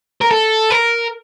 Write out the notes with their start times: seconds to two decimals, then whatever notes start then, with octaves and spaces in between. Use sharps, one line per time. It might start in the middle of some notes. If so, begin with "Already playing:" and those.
0.21 A#4
0.31 A4
0.71 A#4